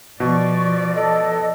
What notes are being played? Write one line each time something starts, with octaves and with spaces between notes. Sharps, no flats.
B2 F3 D5 C#6
A4 D#5